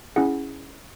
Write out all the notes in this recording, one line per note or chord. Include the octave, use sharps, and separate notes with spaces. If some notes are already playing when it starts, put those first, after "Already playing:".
C#4 E4 G#4 F#5